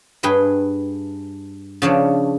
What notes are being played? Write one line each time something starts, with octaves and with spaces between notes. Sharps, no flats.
G2 G#4 B4 G5
C#3 F3 D4 C#5